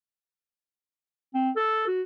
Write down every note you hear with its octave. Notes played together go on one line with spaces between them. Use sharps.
C4
A4
F#4